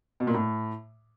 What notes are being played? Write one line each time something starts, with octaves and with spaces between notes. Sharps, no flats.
B2
A#2
A2